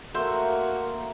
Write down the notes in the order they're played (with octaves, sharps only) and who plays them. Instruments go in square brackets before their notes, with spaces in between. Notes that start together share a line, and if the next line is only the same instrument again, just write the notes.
[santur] A3 C5 [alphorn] A#3 [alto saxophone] F#4 [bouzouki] E5